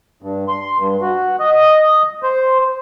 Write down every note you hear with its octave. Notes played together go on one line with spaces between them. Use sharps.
G2
C6
G2
F#4
D#5
C5